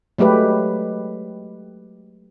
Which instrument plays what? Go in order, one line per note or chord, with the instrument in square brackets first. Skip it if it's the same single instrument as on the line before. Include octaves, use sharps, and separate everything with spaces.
[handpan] F#3 G#3 A3 G4 B4